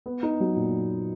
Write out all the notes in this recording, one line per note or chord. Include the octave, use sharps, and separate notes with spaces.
B3
D#4
F#3
A#2